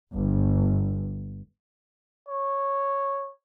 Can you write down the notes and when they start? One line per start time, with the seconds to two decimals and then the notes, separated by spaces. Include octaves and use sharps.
0.13 G1
2.29 C#5